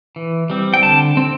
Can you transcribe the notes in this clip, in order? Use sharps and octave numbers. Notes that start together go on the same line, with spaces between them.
E3
G3 C4
G5
D3 A5
C4